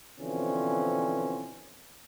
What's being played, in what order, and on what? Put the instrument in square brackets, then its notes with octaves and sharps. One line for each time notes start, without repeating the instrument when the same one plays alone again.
[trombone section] B2 D3 E3 F3 C4 C#4